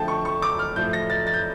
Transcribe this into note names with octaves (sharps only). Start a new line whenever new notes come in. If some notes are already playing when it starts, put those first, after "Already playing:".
Already playing: D3 F3 A3 G5 A5
C#6
C#6
D6
F6
A2 F3 A3 G6
A#6
A6
A6
G6